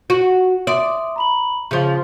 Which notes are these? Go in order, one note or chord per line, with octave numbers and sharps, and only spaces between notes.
F#4
D5 E5 C6 D#6
A#5 B5 F#7
C#3 F3 G#4 F5